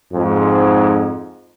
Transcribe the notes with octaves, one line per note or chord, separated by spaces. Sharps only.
F2 G#2